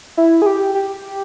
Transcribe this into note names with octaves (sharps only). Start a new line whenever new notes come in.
E4
G#4
G4
G4